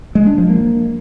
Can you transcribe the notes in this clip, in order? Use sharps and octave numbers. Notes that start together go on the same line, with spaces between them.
G#3
D4
F3
A#3